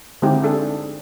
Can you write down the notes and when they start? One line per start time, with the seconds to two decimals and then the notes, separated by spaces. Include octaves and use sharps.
0.22 D3 G#3 C4 D#4 E4 G4
0.44 D4 G#4 A4